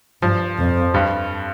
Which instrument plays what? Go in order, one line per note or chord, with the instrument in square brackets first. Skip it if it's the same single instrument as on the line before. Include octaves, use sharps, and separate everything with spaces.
[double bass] G2 [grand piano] F3
[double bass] F2
[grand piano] G2 G3